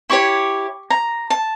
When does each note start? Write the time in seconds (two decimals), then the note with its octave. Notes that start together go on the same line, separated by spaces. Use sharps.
0.10 E4 G4 C#5 C#6
0.90 A#5
1.30 A5